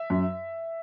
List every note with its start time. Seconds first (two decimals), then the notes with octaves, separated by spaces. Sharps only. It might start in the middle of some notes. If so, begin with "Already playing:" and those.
Already playing: E5
0.10 F#2